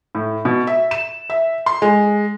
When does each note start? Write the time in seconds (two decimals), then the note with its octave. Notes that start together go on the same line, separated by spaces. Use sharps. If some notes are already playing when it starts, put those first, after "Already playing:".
0.15 A2
0.45 B2
0.67 E5
0.91 E7
1.30 E5
1.66 C6
1.82 G#3